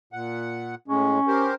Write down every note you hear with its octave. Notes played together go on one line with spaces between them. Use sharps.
A#2 F#5
A2 G#3 C#4
G4 A#4 C5